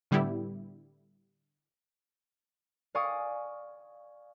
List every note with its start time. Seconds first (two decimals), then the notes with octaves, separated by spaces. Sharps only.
0.11 A2 D3 G3 B3 E4 G4
2.95 D5 F5 G#5 C#6 D#6